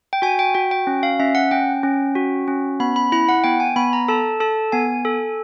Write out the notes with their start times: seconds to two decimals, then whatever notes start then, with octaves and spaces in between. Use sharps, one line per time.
0.13 G5
0.22 F#4 G#5
0.39 G5
0.55 F#4 G5
0.71 G5
0.87 C#4
1.03 F5
1.20 C#4 E5
1.35 F#5
1.51 C#4 G5
1.83 C#4
2.15 F#4
2.48 C#4
2.80 B3 B5
2.96 B5
3.12 E4 B5
3.29 F#5
3.44 B3 G5
3.60 G#5
3.76 B3 B5
3.93 A#5
4.08 A4 A5
4.40 A4 A5
4.72 B3 G#5
5.05 A4